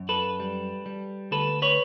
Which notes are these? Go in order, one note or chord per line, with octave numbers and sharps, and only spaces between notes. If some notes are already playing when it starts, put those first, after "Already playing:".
Already playing: F#2
A4 B4
G3
G3
D2 A4 B4
B4 C#5